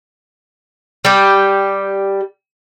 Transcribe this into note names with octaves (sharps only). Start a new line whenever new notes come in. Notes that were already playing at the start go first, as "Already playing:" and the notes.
G3 G4